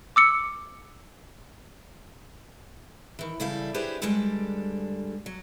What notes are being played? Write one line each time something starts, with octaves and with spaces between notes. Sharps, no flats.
D6 E6 C#7
D#3 E3
E2 C#3 G3 E4 A4 F5
D4 E4 G4 G#4 B4 C5
G2 D3 G3 G#3 A4 G5
F#3